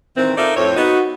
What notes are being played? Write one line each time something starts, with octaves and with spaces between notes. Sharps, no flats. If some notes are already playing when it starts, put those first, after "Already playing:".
A#2 D#3 E3 C4
D#4 F4 A4 A#4 D5 E5
F2 A2 C5 C#5
B3 D#4 F#4